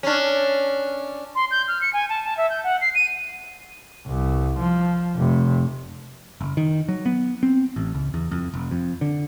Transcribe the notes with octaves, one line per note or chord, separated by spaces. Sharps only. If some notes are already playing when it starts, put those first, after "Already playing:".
C#4 D4
C6
G6
F6
C#7
G#5
A5
A5
E5
G6
F#5
C7
D#7
C2
F3
F1 C3
F#1
D#3
F#3
B3
C4
A1
C#2
E2
F2
F1
F2
D3